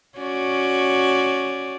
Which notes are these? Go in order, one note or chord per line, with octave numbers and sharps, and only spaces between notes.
C#4 F#4 D5